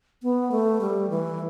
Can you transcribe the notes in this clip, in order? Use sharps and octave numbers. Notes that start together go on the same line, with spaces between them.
B3
A3
G3
E3